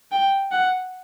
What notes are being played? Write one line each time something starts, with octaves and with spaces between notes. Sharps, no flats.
G5
F#5